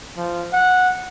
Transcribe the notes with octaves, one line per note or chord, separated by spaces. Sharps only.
F3
F#5